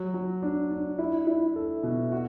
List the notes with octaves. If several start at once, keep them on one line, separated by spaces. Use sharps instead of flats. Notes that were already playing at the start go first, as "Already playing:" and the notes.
Already playing: F#3
F#3
D4
D4
E4
E4
A4
B2
F#4